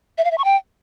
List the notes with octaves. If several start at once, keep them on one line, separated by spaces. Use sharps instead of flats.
E5
F5
E5
C#6
G5